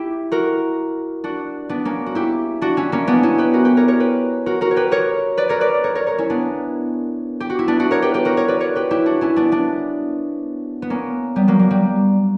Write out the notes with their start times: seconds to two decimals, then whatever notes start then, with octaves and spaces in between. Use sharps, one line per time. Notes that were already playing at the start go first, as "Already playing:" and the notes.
Already playing: E4 G4
0.32 F#4 A#4
1.24 D4 F#4
1.69 B3 D4
1.85 A#3 C#4
2.06 F#4
2.15 E4 G4
2.61 D4 F#4
2.77 C#4 E4
2.92 A#3 C#4
3.07 B3 D4
3.23 C#4 E4
3.38 G4 B4
3.53 F#4 A#4
3.65 G4 B4
3.77 A#4 C#5
3.88 A#4 C#5
4.00 G4 B4
4.46 F#4 A#4
4.61 F#4 A#4
4.71 C#5
4.76 G4 B4
4.91 A#4 C#5
5.37 B4 D5
5.49 A#4 C#5
5.61 B4 D5
5.84 A#4 C#5
5.95 A#4 C#5
6.07 A#4 C#5
6.18 C#4 E4
6.30 B3 D4
7.40 G4
7.50 F#4
7.59 E4
7.68 B3 D4
7.80 D4 F#4
7.91 A#4 C#5
8.02 G4 B4
8.14 G4 B4
8.25 F#4 A#4
8.37 A#4 C#5
8.48 B4 D5
8.60 A#4 C#5
8.76 G4 B4
8.91 E4 G4
9.06 D4 F#4
9.21 C#4 E4
9.36 B3 D4
9.52 B3 D4
10.82 B3
10.90 A#3 C#4
11.36 G3 B3
11.48 F#3 A#3
11.59 F#3
11.71 G3